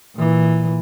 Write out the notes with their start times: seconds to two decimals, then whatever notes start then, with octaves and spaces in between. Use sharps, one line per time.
0.16 A#2 E3